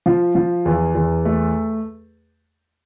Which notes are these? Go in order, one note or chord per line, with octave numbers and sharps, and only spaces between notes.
F3
F3
E2
E2
A3